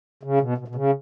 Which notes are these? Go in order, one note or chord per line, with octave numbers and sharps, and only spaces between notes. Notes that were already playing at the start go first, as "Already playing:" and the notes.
C#3
B2
B2
B2
C#3